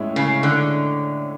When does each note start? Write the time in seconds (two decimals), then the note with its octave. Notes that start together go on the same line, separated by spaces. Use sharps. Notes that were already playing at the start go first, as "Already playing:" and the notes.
Already playing: A2 G#3 C#4 E4
0.16 C#3
0.43 D3